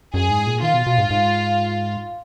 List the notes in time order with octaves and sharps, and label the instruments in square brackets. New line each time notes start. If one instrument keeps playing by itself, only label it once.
[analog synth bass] F#2 [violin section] G#4
[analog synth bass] G#2
A#2
[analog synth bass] D#3 [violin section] F4
[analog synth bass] B2
B2
G#2
G#2